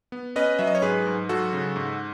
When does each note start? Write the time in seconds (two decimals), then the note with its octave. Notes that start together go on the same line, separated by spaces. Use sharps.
0.12 B3
0.36 C#4 B4 D#5
0.59 F#3 E5
0.67 D#5
0.75 C#5
0.82 G#2 G#4 B4
1.07 G#2
1.29 F#3 F#4 A4
1.53 C#3
1.76 G#2